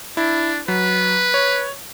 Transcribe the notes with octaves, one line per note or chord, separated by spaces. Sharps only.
D4 E4
F#3 B4
C#5